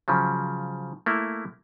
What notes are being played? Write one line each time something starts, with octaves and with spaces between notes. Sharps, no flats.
C#3 F3 F#3
A3 A#3 E4